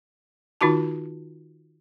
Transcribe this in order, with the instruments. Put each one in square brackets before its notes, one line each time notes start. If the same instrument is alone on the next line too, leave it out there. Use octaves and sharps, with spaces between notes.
[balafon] D#3 D#4 F4 F#4 A5